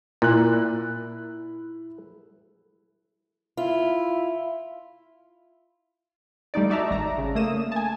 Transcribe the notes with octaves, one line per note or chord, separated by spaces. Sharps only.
A#2 E4 F#6
E4 F4
G3 A3 D#4 D5
D#4 F#4 D5 E5 A5 A#5
G#1 A#5
C#3
A3 A#3 D#6 E7
G#5 A5